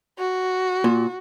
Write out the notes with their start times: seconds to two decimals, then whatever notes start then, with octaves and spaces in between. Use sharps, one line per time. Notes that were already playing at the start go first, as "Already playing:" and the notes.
0.19 F#4
0.84 A#2